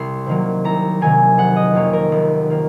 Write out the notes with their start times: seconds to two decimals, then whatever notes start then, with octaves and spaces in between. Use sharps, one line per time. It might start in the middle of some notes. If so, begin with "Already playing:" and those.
Already playing: C2 C6
0.26 C3 D#3 F#3 A#3
0.64 C2 A#5
1.01 C3 D#3 F#3 A#3 G#5
1.38 F1 F#5
1.56 D#5
1.73 F2 D#3 A#3 C#5
1.93 A#4
2.12 F1
2.50 D#3 A#3